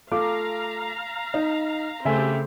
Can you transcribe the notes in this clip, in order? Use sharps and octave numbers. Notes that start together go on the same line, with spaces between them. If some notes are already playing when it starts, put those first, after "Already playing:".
A3 F4 F5 A#5 D6
D#4
C#3 A3 C4 G4 E5 G#5